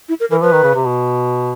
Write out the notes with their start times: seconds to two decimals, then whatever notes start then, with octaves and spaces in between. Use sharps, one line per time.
0.09 E4
0.20 A#4
0.31 E3 A#4
0.42 F3 B4
0.52 D#3
0.63 C#3
0.75 C3
0.85 B2